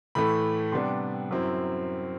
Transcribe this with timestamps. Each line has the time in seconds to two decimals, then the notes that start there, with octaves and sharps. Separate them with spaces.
0.15 A2 E3 A3 B5
0.72 C3 G3 B3 D4 C6
1.31 F#2 F#3 C4 E4